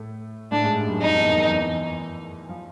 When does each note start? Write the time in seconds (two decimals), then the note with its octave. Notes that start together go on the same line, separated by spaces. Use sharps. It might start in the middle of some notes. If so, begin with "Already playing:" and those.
Already playing: A2 A3
0.51 A2 A3 D4
0.63 G#2 G#3
0.76 G2 G3
0.88 F#2 F#3
1.01 F2 F3 D#4
1.14 E2 E3
1.25 D#2 D#3
1.38 E2 E3
1.50 E2 E3
2.49 F3